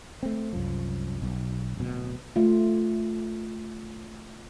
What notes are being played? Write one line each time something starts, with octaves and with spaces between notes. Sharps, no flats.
A3 C4
C2 F#2 F3
B1
D1 B2
A3 F4